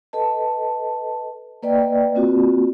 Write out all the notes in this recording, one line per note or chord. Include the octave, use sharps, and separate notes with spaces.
A4 B4 D#5 A5
A#3 B4 D5 D#5 G5
A#3 C4 F4 F#4